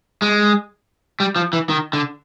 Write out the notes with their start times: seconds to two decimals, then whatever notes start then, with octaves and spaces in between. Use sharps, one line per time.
0.22 G#3
1.20 G3
1.36 F3
1.53 E3
1.69 D#3
1.93 D3